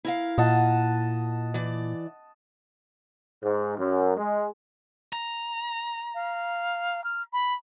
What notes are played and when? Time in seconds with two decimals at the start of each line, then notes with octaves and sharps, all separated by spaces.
0.05 E4 A#4 F5
0.38 A#2 D#5 F#5 A5
1.54 E3 D5
3.43 G#2
3.78 F#2
4.17 G#3
5.13 A#5
6.15 F5
7.04 F6
7.33 B5